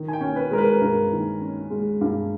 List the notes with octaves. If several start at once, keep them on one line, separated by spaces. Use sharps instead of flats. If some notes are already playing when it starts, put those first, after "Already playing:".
Already playing: D#3
G#5
G5
C#4
B4
G#3 A#4
B4
G2 A#4
D#3
C#4
G#3
G2